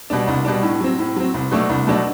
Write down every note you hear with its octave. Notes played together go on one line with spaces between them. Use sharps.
B2 G3 D4
C2
B2 G3 D4
A2
F#3 C4
A2
F#3 C4
C2
B2 F#3 A3 D4
C2
B2 F#3 A3 D4